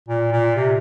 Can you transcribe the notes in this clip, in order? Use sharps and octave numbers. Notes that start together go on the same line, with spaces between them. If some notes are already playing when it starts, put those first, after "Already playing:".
A#2
A#2
C3